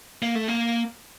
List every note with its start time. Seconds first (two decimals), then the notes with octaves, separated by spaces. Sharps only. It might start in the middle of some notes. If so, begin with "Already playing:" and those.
0.22 A#3
0.35 A3
0.48 A#3